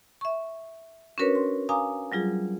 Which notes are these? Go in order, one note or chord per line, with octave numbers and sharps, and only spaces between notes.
E5 C#6
C#4 D4 F#4 A#4 B4 C#5
C6
F5 G#5 A#5 D6 D#6
F#3 G3 F4 G#4